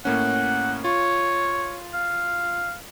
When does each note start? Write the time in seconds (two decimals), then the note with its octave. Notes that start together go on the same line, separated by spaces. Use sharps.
0.05 A2 A#3 C#4 F#5
0.84 F4 C#5
1.94 F5